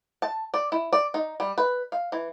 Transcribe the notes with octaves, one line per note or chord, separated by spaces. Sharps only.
A5
D5
E4
D5
D#4
G3
B4
F5
E3